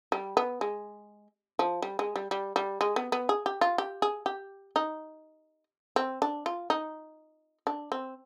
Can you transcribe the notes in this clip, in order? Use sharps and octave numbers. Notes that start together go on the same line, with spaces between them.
G3
B3
G#3
F3
G3
G#3
G3
G3
G3
G#3
B3
B3
G#4
G4
F4
G4
G#4
G4
D#4
C4
D4
F4
D#4
D4
C4